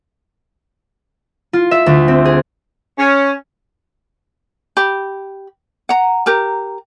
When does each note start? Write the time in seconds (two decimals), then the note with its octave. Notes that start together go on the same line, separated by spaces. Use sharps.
1.53 F4
1.71 E5
1.86 D2
2.08 C4
2.25 G#4
2.99 C#4
4.77 G4 B5
5.89 F#5 A#5
6.26 G4 A#4 A#5